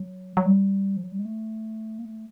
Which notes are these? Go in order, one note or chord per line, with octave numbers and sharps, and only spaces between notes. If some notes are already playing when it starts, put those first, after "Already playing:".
Already playing: F#3
F#3
G3
F3
F#3
G3
G#3
A3
A#3
A3